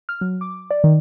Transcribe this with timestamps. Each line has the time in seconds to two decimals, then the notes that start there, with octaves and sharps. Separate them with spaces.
0.09 F6
0.21 F#3
0.41 D6
0.70 D5
0.84 D#3